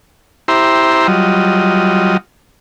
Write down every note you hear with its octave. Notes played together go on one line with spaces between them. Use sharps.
E4 G4 C5 E5 A#5 C6
F#3 G3 F4 D#5